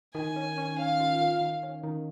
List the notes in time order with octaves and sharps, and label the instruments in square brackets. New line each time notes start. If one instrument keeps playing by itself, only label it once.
[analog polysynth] D#3 [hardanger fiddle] G#5
[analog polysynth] C#4
C#4
[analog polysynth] C#4 [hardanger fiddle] F5
[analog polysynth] F4
D#3
D#3
C#4
D#3